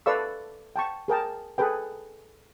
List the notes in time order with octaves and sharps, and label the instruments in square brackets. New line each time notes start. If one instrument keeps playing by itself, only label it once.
[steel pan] A4 B4 D5 F5 C#6 E6
G5 A5 C#6
G#4 A#4 G5 A5
G#4 A4 B4 G5